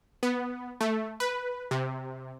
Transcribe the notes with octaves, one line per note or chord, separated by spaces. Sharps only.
B3
A3
B4
C3